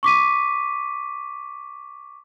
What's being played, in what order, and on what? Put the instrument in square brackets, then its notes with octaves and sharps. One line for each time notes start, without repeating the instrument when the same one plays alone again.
[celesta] C#6 D6 B6 D#7